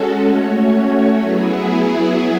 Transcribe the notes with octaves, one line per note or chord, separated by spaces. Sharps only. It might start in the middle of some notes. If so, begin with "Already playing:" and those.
Already playing: G#3 C#4 F#4 A4
A3 C#4 F#4 C#5
F#3 B3 E4 G#4